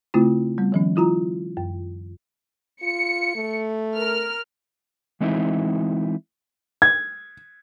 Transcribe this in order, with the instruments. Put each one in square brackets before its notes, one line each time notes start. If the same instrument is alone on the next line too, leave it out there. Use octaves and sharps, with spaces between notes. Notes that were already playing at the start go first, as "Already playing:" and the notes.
[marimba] C#3 A3 C4 E4 F4
G3 B3
D#3 F3 C#4
F3 E4 F4 A#5
F#2
[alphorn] F4 [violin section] C#7
[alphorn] A3
[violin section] A#4 F6
[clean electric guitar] E3 G#3 C4 D#4 E4
[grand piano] G#6